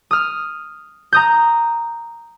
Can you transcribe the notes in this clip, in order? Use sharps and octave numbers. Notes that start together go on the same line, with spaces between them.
D#6 F6
A#5 D#6 G6